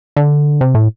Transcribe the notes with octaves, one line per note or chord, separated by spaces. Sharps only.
D3
C3
A2